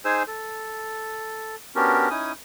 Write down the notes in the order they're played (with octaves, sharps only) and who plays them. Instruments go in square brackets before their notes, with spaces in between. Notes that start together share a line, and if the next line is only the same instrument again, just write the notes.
[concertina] D#4 G#4 C5 G#5 E6
A4
B3 C#4 D4 F#4 G4 A#4
C#4 D#4 E4 G#5 D#6